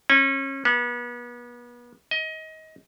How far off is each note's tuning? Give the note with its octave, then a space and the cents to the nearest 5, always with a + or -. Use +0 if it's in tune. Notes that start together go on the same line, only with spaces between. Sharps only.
C#4 -30
B3 -35
D#5 +25